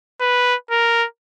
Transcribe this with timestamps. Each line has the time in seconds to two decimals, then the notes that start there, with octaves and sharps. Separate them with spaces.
0.20 B4
0.71 A#4